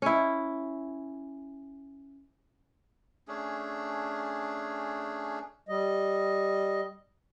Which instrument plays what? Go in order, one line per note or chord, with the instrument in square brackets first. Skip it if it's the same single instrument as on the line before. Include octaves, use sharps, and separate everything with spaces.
[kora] C#4 E4
[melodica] A3 C#4 D4 G#4
[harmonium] G3 D#5